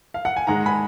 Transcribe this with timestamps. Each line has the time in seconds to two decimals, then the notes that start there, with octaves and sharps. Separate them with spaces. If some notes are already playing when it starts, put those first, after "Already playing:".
0.14 F5
0.25 F#5
0.37 G#5
0.47 G#2 D#3 G#3 F#5 A#5
0.66 G#5 B5